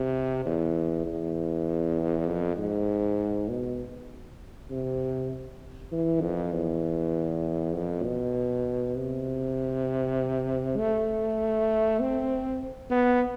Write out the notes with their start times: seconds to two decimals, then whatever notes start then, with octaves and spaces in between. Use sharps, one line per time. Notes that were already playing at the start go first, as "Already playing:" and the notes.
Already playing: C3
0.45 E2
1.06 E2
2.27 F2
2.57 G#2
3.49 B2
4.71 C3
5.92 E3
6.21 F2
6.53 E2
7.74 F2
8.04 B2
8.96 C3
10.77 A3
12.00 C4
12.90 B3